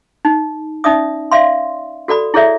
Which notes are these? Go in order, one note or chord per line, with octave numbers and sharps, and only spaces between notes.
D#4
C#4 D#4 D5 E5 D#6
D5 E5 F5 C6
F#4 A4 D5 B5
E4 G#4 A4 C#5 D5 E5